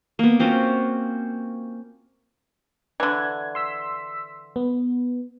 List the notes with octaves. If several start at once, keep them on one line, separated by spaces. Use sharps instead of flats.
A#3 B3
C4 C#4 F4 F#4
D3 E3 G#6
C6 E6 B6
B3